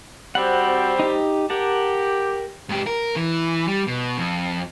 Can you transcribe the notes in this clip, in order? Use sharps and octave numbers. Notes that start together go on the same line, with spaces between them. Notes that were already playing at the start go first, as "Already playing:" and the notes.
G3 C4 F#4 F#5
D#4 G4
G4 A#4 F#5 A5
G#2 G4
A#4
E3
G3
B2
F2